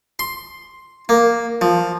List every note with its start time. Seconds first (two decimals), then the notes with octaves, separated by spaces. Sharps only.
0.19 C6
1.09 A#3
1.61 F3